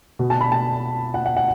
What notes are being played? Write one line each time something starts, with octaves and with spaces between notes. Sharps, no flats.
B2
A5
B5
A5
F#5
F#5
F#5